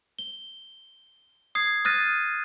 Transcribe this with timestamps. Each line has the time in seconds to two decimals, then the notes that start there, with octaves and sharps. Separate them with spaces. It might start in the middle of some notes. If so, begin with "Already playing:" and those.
0.19 G7
1.55 D#6 G#6 C7
1.85 D#6 F6 F#6 A6 A#6 D#7